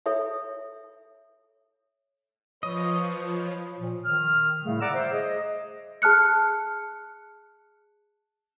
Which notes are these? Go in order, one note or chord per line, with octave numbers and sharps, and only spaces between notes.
A4 C#5 E5
F3 B4 C#5 D#5
A#2 F3
D#3 D#6 F6
A2 C#3 G3 A3
D5 F#5 A#5 D6 E6
C5 E5
G#4 D#5
G#4 A5 F6 F#6 C#7